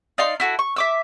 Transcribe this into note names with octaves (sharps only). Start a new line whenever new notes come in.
D#4 D5 F5 C6
E4 F#4 A4
C#6
E5 D6 E6